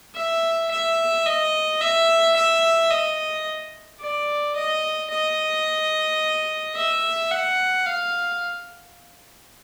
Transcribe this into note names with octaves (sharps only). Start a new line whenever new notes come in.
E5
E5
D#5
E5
E5
D#5
D5
D#5
D#5
E5
F#5
F5